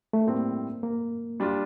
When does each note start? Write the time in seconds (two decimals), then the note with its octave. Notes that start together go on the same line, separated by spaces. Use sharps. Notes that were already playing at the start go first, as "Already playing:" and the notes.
0.13 A3
0.27 A2 G3 A#3 C4
0.83 A#3
1.40 G3 D4 F4